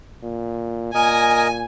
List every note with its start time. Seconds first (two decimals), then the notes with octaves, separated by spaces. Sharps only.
0.23 A#2
0.95 A#2 A#4 D#5 G#5